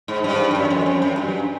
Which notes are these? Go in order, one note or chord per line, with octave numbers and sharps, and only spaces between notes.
G#2
G2
G2
F#2
F2
F#2
F#2
G2